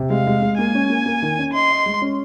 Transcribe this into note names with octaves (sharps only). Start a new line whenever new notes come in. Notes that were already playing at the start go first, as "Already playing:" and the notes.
Already playing: C3
G#3 F5
G#3
G#3
A#3 G#5
C#4
A#3
A#3
D#3
C#4
D#5 C6
D#5
G#3
C#4